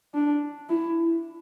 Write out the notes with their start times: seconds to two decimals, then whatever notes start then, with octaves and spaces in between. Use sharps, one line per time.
0.14 D4
0.69 E4